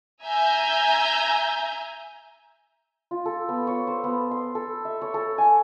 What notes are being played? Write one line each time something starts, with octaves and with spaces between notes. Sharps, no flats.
E5 G#5 A#5 G6
F4
A4
B3
C#5
C5
B3
C6
A4
E5
C#5
A4
G#5